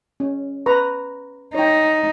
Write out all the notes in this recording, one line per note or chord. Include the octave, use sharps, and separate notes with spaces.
C#4
B4 A#5 C#6
D#4 C#5 G5